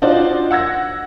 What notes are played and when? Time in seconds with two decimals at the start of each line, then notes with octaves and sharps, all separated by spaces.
0.02 D4 D#4 F4 F#4 C5 D5
0.51 F#5 E6 G#6 A#6